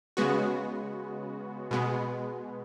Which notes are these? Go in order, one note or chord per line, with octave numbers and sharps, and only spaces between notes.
C#3 G#3 B3 F#4
B2 G#3 B3